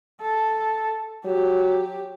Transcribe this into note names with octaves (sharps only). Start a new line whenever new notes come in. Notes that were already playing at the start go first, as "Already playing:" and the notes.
A4
F#3 G4